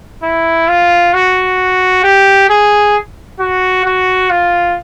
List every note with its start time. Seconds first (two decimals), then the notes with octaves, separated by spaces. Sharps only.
0.23 E4
0.68 F4
1.14 F#4
2.03 G4
2.49 G#4
3.39 F#4
3.85 F#4
4.30 F4